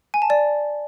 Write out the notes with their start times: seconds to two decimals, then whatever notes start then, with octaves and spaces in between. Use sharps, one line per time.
0.14 G#5
0.22 A5
0.30 D5